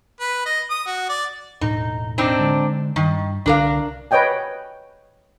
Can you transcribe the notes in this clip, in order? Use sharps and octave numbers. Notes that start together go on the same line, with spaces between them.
B4
D#5
D#6
F#4
D5
E1 A2 D#4
C4 D4 D#4
D3 G#3
G2 D#3
C2 D3 D4 A#4 F5
B4 C#5 D#5 G5 G#5